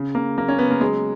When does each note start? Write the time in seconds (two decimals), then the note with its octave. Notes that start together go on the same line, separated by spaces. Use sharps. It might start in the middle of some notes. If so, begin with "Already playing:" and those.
Already playing: C#3
0.15 C#3 A#3
0.37 F#3 A#3
0.48 C#4
0.59 C#3 B3
0.70 A#3
0.81 F#3 G#3